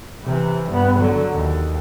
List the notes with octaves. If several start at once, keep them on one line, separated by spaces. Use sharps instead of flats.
C3 E3
G2 B3
D3 F#3
D#2